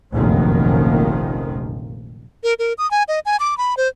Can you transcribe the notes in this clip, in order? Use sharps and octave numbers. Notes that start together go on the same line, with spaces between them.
F1 A#1 F#2 A#2 D#3 F3
A#4
A#4
D#6
G#5
D#5
G#5
D6
B5
C5